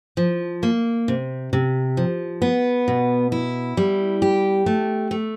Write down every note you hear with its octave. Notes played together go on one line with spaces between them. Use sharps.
F3
A#3
C3
C3
F3
B3
B2
E4
G3
G4
A3
A3